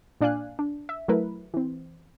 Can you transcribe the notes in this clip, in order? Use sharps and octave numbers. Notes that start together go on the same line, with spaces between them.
A#2 D4 D5 F5 G#5 F#6
D4
E5
F#3 A3 E4 A#4 B4
E3 C4